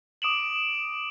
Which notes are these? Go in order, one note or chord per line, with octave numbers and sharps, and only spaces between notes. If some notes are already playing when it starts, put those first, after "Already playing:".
D6 D#6 D7 E7 F#7